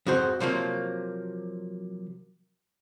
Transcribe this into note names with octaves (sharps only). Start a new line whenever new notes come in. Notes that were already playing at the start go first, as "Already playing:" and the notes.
F2 G#2 F#4 C5
C3 F3 F#3 A#3